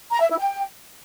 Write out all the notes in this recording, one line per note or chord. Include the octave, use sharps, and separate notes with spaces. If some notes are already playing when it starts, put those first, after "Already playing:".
A#5
E5
E4
G5